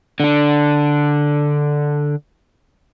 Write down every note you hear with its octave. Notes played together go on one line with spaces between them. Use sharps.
D3 D4